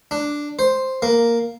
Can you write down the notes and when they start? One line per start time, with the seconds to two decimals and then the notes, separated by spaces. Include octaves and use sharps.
0.11 D4
0.59 C5
1.02 A#3